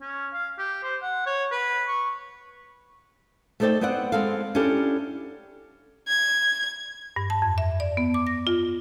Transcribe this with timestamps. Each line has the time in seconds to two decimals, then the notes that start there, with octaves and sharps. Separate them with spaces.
0.01 C#4
0.33 F5
0.58 G4
0.83 C5
1.02 F#5
1.26 C#5
1.52 B4
1.88 C#6
3.60 A3 D#4 A4 C5 D5 G5
3.81 B3 C4 C5 D5 F#5
4.12 G#3 B3 C4 A4 F5
4.55 C#4 D4 E4 G4 A4
6.08 G#6
7.16 G2
7.30 A5
7.42 F2
7.58 E5
7.80 D5
7.97 B3
8.14 D6
8.27 A#6
8.47 F4